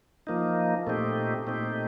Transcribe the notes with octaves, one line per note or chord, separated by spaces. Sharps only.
F3 A#3 D#4
A#2 A3 C4 D#4 G4
A#2 A3 C4 D#4 G4